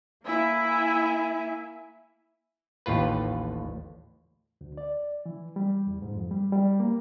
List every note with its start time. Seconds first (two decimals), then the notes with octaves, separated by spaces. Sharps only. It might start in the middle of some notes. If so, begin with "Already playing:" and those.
0.24 A#3 E4 E5 G#5
2.86 A1 D#2 A2 F4 B4
4.61 D2
4.77 D5
5.26 E3
5.56 G3
5.87 E2
6.02 G#2
6.15 F2
6.31 G3
6.52 G3
6.80 A#3